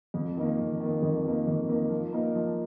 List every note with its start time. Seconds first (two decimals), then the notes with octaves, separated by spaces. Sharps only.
0.14 F2
0.37 D#3 A#3
0.59 F2
0.80 D#3 A#3
1.02 F2
1.25 D#3 A#3
1.47 F2
1.69 D#3 A#3
1.90 F3
2.13 A#3 D#4 A#4
2.35 F3